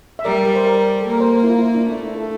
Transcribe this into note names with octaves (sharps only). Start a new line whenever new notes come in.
E5
G3 A#4 D5
A#4
C5
A#4 D5
A4
A#3 A#4
C5
A#4
E4
F4
E4
D4
A3 D4
E4
A4